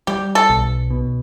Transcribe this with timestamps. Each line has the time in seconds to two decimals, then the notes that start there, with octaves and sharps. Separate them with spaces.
0.07 G3 G4
0.35 A4
0.49 B1
0.90 B2